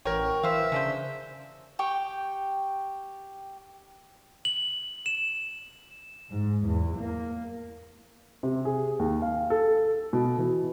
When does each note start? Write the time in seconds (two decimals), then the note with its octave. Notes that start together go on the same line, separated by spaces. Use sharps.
0.05 A1 F#4 A#4 C#5 G5
0.43 E3 C5 E5 F5 E6
0.72 C#3 C#4 D4 C5
1.79 G4 G5 C#6
4.45 F#7
5.06 E7
6.31 G#2
6.67 E2
6.98 A#3
8.43 C3
8.65 G#4
8.99 D#2
9.22 F5
9.50 A4
10.13 B2
10.38 E3